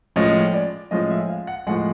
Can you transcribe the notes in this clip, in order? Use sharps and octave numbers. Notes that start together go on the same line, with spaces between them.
A2 F3 G#3 C#4 D#5
D5
A2 F3 G#3 C#4 D#5
E5
F5
F#5
A2 F3 G#3 F#5